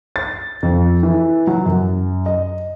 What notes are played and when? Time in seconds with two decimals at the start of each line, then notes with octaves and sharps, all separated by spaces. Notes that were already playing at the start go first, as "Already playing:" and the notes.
0.16 A6
0.63 F2
1.03 E3
1.47 F#3
1.66 F#2
2.26 D#5